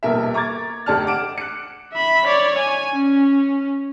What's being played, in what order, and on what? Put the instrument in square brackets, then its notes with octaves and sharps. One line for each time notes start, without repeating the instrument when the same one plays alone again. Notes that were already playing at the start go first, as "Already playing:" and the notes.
[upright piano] D#1 A#1 B2 A#4 E5
A#5 C#6 D6 G#6 A6
F1 D2 G4 D5 A5 F6
F#5 D6 D7 E7
F#6 C#7
[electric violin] E5 B5
C#5 D5
G#5
C#4